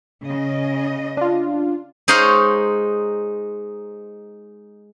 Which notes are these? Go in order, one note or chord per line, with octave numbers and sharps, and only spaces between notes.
C#3 D#5
D4 F4
G#3 D#4 C5 C#5 F5